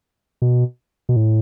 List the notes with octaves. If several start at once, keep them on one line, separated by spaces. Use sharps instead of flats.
B2
B2
A2